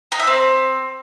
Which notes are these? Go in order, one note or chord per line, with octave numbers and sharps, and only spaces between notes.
D#4
E5
C4